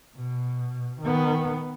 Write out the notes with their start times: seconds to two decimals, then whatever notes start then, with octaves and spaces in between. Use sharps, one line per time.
0.16 B2
1.01 D#3 B3